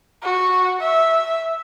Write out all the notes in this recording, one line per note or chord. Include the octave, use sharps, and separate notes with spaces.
F#4
E5